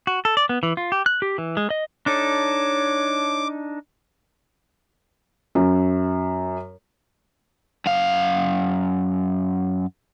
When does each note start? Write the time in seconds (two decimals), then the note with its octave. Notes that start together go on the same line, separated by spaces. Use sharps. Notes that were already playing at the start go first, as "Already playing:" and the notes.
0.07 F#4
0.25 A4
0.37 D5
0.49 B3
0.63 E3
0.77 F4
0.92 G4
1.06 F#6
1.22 G4
1.38 E3
1.57 G#3
1.70 D#5
2.06 D4 D#4 A4 C#5 D6
5.55 F#2
7.86 F#2 F5